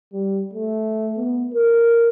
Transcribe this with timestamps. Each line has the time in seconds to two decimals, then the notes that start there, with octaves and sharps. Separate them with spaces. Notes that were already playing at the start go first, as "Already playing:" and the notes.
0.13 G3
0.54 A3
1.17 B3
1.54 A#4